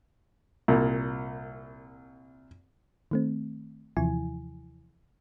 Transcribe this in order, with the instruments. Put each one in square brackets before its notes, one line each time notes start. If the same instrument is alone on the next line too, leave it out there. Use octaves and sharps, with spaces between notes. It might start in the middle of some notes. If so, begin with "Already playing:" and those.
[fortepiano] C2 A#2
[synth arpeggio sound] D#3 A3 C4
D#2 C3 E3 F3 E4 G#5